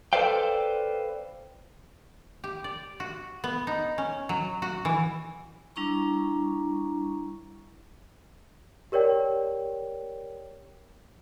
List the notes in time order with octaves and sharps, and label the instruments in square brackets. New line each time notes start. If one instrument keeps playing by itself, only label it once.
[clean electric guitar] A4 B4 C5 D5 F5 G5
[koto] G4
D5
F#4
B3
D#4
C#4
F#3
F#4
E3
[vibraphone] G3 D4 E4 A#5 C#6
[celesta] G4 A#4 C#5 D5 G5